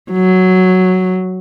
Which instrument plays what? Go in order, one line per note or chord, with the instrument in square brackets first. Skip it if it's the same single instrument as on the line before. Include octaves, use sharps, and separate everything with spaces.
[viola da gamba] F#3